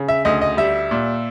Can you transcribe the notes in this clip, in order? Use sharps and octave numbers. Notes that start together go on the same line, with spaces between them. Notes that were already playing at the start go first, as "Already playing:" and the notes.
Already playing: C#3
E5
D2 D#5
D#5
G3 E5
A#2